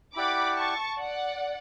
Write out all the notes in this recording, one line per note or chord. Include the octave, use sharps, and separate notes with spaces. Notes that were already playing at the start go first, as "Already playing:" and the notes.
E4 G4 D5 F#5 B5 D6
A5 C#6
D5 F#5